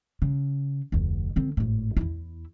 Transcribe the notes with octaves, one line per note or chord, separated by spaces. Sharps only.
C#3
F1 D2
D3 C4
G#1 A2
E2 E4